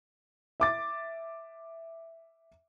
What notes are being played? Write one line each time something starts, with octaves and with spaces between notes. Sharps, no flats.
E5 D6 A6